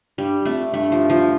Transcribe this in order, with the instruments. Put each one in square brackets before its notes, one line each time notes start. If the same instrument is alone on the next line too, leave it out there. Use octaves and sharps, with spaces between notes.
[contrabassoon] G2 [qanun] G3
[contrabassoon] F2 [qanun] A3
[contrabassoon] G2 [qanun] A3
[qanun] F3
F3